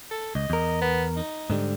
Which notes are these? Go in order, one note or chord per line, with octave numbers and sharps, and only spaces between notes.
A4
C#2 D#5
E2 A#4
B3
D#4
G#2 D3 G3